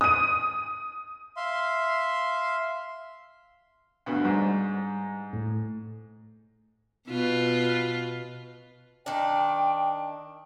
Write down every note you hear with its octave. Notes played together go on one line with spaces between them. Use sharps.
D#6 D#7
E5 F5 C6
D2 G2 B2
G#2 G3 G#3
A2
B2 F4 B4
D#3 D4 G5